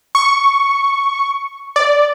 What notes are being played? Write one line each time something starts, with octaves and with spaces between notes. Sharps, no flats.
C#6
D5